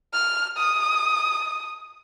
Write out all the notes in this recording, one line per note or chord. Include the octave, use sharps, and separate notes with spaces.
F6
D#6